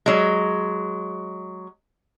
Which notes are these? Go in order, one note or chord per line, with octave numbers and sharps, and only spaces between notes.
F#3 G#3